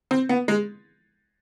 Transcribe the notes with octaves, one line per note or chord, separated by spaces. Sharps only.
C4
B3
G#3